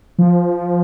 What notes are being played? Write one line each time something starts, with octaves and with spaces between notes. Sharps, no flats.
F3